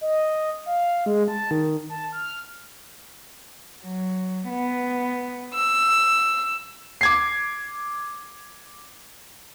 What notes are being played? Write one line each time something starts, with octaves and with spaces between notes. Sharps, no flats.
D#5
F5
G#3
A5
D#3
A5
F6
F#3
B3
E6
D6 G#6 C7